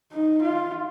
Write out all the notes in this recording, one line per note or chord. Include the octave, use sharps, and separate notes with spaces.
D#4
F4